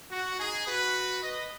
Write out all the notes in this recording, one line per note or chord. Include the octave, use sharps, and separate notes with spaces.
F#4
D#4 G#4
F#4 B4
B4 D#5